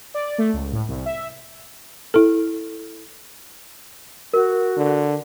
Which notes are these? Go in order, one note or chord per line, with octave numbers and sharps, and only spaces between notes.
D5
A3
C#2
A2
C2
E5
E4 A4
F#4 A#4
D3